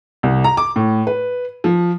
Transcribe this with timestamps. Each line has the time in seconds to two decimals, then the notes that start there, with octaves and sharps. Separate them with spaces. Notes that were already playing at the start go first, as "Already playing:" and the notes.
0.23 C2
0.44 A#5
0.57 D6
0.76 A2
1.07 B4
1.64 F3